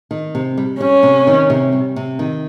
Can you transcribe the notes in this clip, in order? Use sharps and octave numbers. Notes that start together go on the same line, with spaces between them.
D#3
C3
G3
G3 C#4
C3
D#3
C3
G3
C3
D#3